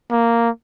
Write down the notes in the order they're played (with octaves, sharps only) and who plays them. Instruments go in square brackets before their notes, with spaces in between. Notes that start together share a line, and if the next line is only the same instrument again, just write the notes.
[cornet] A#3